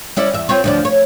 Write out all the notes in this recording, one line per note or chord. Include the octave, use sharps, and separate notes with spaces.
C#4 E4 D5
E2 E5
C4 F4 C#5
D2 F3 D5
C#5